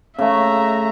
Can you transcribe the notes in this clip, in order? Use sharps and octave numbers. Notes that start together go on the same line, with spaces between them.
C#3 A3 E5 A#5